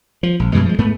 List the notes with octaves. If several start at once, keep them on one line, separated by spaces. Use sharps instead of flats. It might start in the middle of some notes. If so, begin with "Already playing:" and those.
F3
A#1
F#2 B2 E3 G#3
F3 G#3
G#2 A3 B3